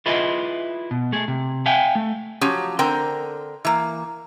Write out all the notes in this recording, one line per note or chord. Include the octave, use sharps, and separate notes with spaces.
E4 F4 G#4 B4 D#5 E5
B2
A3 G#4
C3
E5 F5 G5 G#5
A3
F3 F#3 C#4 G4
D3 C4 A#4 G5
E3 A#3